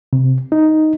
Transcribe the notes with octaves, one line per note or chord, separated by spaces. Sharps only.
C3
D#4